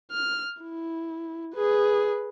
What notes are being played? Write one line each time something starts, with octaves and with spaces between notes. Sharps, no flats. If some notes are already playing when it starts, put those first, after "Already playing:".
F6
E4
G#4 B4